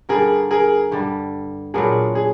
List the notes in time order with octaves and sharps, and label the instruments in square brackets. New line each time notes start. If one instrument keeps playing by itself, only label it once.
[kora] G2 D3 G3 [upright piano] G#4 A#4
[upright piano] G#4 A#4
[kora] G2 D3 G3
[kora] A#2 F#3 B3 D4 [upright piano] G#4 A#4
[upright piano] G#4